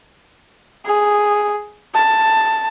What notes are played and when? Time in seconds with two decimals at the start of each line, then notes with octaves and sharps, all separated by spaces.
0.85 G#4
1.95 A5